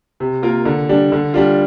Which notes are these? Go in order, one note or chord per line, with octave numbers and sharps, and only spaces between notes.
C3
A#3 F4 A#4
D3
G3 D4
D3
G3 D4 F4